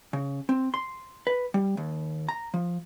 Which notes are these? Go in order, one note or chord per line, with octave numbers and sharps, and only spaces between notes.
C#3
C4
C6
B4
G3
D#2
A#5
F3